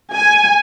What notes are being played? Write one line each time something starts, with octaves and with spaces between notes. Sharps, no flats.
G#5